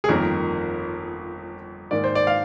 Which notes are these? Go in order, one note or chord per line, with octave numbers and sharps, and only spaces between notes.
G#4
G1 F2 D#3 A#3 A#4
G#2 D#3 A#3 D5
C5
D5
F5